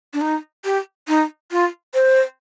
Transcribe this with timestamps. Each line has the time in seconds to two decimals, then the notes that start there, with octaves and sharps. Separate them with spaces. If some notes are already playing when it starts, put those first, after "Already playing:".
0.13 D4
0.21 D#4
0.65 G4
1.08 D#4
1.51 F4
1.94 C5